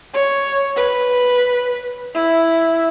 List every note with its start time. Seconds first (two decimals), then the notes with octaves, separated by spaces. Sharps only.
0.14 C#5
0.77 B4
2.14 E4